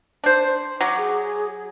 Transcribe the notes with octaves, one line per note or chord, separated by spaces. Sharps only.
D4 C5
F#3 D6
G#4